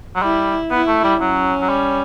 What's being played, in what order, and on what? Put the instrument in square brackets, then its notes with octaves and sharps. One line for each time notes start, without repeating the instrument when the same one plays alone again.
[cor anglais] F#3
[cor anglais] G3 [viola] E4
[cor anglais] B3 [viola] E4
[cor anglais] A3
G3
[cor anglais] F#3 [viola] C#4
[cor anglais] F#3
G3